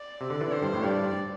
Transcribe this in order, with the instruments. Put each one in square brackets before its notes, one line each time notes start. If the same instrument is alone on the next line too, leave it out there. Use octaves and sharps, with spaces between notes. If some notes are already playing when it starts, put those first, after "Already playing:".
Already playing: [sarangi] D5
[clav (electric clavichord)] C3
D3
E3
[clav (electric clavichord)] D3 [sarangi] C5
[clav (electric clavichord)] G2
A2
[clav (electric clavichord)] G2 [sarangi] D5